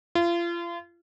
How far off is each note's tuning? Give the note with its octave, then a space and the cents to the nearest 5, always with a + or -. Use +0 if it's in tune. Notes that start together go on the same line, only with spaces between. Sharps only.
F4 -35